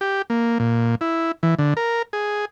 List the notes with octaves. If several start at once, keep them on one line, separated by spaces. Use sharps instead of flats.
G4
A#3
A#2
E4
E3
D3
A#4
G#4